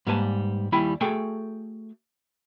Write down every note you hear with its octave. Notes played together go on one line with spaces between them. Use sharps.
G#2 G3 A#3 B4 G#5 A5
D#2 G3 E4 G5 G#5 B5
A3 F#4 G#4 A4 G5 G#5